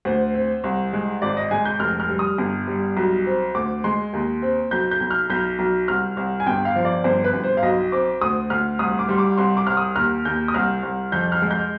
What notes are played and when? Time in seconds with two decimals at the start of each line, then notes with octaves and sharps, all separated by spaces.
0.05 D2 C5
0.34 C4
0.64 C2
0.93 G#3
1.22 G#1 D5
1.37 D#5
1.51 G#3 G#5
1.65 G6
1.80 F1 F6
2.00 F6
2.09 G3
2.19 D#6
2.38 G1
2.67 G3
2.97 B1
3.26 C4
3.55 D2 D6
3.84 G#3 C6
4.13 D#2
4.42 C4
4.71 B1 G6
4.91 G6
5.00 B1
5.11 F6
5.30 B1 G6
5.59 B1
5.88 C2 F6
6.17 C2
6.40 G#5
6.46 G1 G5
6.65 F5
6.76 F3
6.85 D5
7.04 G1 C5
7.24 B4
7.34 G1
7.44 C5
7.57 F5
7.63 B1 D#5
7.92 C4 D6
8.21 D2 D#6
8.50 D2 F6
8.79 C2 D#6
8.99 D6
9.09 G3 C6
9.18 D6
9.37 C2 C6
9.57 D6
9.66 C2 F6
9.77 D#6
9.95 D#2 F6
10.25 D#2 G6
10.48 D#6
10.54 C2 F6
10.83 C2
11.12 F2 G6
11.32 F6
11.42 G#3
11.51 G6